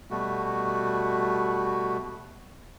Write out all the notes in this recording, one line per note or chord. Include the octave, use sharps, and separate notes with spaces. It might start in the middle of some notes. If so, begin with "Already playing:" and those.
B2 G3 A3 F#4